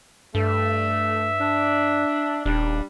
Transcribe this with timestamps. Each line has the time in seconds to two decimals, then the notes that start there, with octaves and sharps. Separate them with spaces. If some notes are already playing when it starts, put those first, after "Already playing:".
0.35 G2 A3 E5
1.40 D4
2.46 D#1 G3 D4